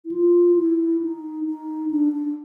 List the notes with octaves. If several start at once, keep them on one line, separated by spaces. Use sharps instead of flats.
E4
F4
E4
D#4
D#4
D4
D4